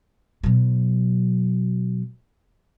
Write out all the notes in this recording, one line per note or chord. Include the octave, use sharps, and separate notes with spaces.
B2 F#3